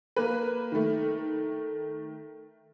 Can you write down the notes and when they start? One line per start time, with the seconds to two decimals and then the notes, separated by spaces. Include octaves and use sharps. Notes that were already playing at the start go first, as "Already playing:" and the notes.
0.16 A#3 B4
0.72 D#3 A3